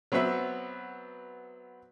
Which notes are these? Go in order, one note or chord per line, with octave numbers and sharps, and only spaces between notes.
F#3 B3 C4 B4 E5